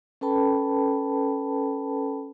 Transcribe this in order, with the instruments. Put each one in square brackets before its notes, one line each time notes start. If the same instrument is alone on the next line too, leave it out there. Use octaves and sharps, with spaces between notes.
[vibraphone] C#4 A4 B4 G5 A5 B5